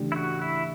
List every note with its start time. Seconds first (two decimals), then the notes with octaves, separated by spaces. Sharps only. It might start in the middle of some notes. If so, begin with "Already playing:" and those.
Already playing: C#3 E3 A3 D4 G4
0.12 E4
0.16 F#4
0.42 E4